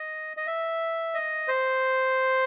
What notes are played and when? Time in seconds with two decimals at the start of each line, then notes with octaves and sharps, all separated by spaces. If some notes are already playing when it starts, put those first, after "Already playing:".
Already playing: D#5
0.37 D#5
0.47 E5
1.15 D#5
1.48 C5